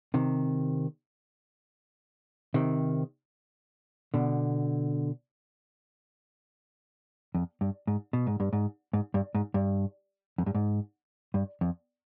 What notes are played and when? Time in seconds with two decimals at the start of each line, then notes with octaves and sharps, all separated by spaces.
0.14 C3 D#3
2.54 C3 D#3
4.14 B2 D3
7.35 F2
7.61 G2
7.87 G#2
8.13 B2
8.27 G#2
8.40 G2
8.53 G#2
8.93 G#2
9.14 G2
9.35 G#2
9.54 G2
10.38 F2
10.46 G2
10.55 G#2
11.34 G2
11.61 F2